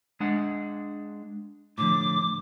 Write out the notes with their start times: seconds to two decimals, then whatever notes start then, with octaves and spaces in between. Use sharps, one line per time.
0.20 G#3 D4 F#5
1.78 A2 D3 F3 D6